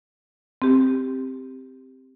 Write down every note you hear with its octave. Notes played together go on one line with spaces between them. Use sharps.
C4 G4